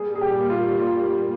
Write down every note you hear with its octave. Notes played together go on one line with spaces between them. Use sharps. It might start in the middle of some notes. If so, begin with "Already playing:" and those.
Already playing: A#2 G3 A#3 G#4
G#4
G4
F4
F4